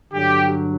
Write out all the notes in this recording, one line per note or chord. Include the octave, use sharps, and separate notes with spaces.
G2 D3 F#3 G4